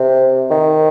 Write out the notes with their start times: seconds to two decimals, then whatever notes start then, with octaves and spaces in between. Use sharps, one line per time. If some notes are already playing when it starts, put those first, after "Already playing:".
Already playing: C3
0.50 D#3